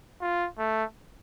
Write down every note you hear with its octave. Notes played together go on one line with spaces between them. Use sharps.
F4
A3